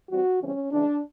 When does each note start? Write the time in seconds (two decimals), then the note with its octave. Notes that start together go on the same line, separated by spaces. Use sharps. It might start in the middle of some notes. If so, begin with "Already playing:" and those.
0.10 E3 G3 C4 F#4
0.41 C#3 E3 G3 C4 C#4
0.72 C#3 E3 G#3 D4